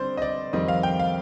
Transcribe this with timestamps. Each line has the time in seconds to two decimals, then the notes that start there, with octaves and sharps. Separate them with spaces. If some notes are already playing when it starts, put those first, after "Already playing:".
Already playing: D3 G3 C4 C5 D5
0.17 D#5
0.22 D5
0.53 F2 D#3 G3 C4 D#5
0.68 F5
0.83 G5
0.99 F5